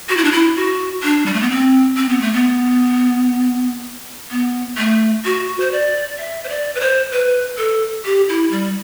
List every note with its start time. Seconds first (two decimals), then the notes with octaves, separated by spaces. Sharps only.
0.09 F#4
0.17 E4
0.24 D4
0.32 E4
0.57 F#4
1.03 D4
1.26 G3
1.34 A3
1.42 B3
1.50 C4
1.97 C4
2.09 B3
2.21 A3
2.33 B3
4.31 B3
4.78 A3
5.25 F#4
5.60 C5
5.72 D5
6.18 E5
6.44 C5
6.49 D5
6.75 B4
6.80 C5
7.12 B4
7.58 A4
8.05 G4
8.29 E4
8.51 G3